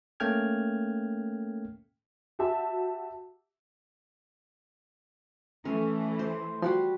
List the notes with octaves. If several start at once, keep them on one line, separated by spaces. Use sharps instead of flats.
A3 A#3 C#4 G5 F6 G#6
F#4 G4 E5 A5
E3 A3 C#4
C5
F3 G3 F#4 C6